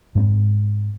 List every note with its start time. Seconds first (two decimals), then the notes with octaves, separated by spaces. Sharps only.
0.15 G#2 G#3 A3 C4